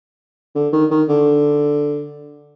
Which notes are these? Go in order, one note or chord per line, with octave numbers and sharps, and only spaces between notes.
D3
D#3
D#3
D3